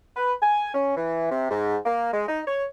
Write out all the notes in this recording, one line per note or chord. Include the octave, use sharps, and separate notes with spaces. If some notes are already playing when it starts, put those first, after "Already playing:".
B4
G#5
C#4
E3
C3
G#2
A#3
G#3
D#4
C#5